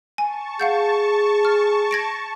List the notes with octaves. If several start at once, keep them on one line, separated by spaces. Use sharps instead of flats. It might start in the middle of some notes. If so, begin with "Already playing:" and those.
G#5 A5 C#6
G#4 F5 F#5 G6
F6
G#6 A#6 D7